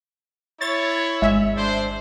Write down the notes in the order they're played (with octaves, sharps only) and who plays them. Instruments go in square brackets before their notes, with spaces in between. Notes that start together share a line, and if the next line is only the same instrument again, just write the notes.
[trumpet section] E4 C#5 [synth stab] A6
[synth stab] G#1 G#3 E5
[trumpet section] D4 C5